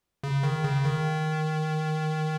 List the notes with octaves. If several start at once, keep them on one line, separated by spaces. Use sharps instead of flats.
C#3
D#3
C#3
D#3